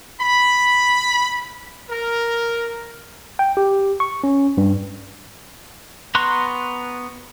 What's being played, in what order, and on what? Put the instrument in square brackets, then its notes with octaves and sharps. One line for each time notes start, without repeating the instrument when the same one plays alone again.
[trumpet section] B5
A#4
[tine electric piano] G5
G4
C#6
C#4
G2
[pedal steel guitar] B3 A#5 C6 C#6 F#6